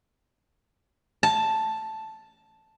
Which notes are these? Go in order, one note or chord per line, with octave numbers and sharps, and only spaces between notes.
A5